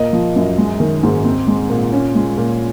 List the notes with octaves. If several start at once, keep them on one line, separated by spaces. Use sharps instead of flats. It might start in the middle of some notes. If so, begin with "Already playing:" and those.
Already playing: A#2 A#3 D#5
F3
F#2
G#3
D#3
G#2
C4
G#3
A#2
C#4
G#3
A#2